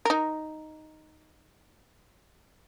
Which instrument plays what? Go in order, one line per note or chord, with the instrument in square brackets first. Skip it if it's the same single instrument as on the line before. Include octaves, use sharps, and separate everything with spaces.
[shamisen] D#4 A#4